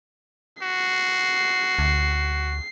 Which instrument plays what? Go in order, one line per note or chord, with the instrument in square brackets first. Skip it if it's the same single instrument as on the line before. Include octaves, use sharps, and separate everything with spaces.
[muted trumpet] F#4 [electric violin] C7
[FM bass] D2